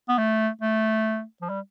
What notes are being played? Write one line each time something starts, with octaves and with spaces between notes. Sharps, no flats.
B3
A3
A3
F3
G3